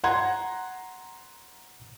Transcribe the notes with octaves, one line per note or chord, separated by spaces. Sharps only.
F#5 A#5 C6 G#6